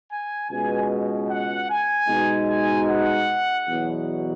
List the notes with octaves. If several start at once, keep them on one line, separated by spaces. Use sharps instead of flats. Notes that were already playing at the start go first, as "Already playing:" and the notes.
G#5
C#2 B2 G#3 G#5
F#5
G#5
B2 G#3 D#4
G#5
F#5
E2 B2 F#3